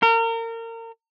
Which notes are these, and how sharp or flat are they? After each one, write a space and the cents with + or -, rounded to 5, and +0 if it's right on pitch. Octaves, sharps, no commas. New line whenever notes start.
A#4 -30